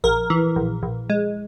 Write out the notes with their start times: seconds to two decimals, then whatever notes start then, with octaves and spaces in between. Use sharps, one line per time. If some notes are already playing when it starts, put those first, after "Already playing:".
0.04 A#1 A#4
0.30 E3
0.56 A#1
0.83 A#1
1.10 G#3